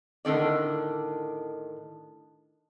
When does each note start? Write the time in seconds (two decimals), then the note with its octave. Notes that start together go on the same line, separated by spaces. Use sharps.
0.25 A2 D3 D#3 D5